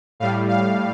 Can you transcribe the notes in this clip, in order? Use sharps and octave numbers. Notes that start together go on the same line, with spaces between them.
A2 G3 F5
F5